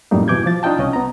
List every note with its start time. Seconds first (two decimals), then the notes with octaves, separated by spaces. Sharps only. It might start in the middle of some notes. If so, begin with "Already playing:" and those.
0.11 F#2 A2 G3 A#3 D#4
0.28 B2 E3 D6 G6 G#6
0.46 F3 A6
0.63 D4 D#4 F4 D#5 G5 A5
0.79 C2 C#4 D#5
0.93 B3 A#5